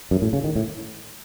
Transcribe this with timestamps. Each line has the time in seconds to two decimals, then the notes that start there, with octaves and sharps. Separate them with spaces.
0.11 F#2
0.22 A2
0.33 C#3
0.44 D#3
0.56 A2